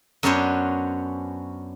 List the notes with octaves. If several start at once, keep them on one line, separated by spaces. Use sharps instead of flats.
F#2 B3 C#4 D4 C5 C#5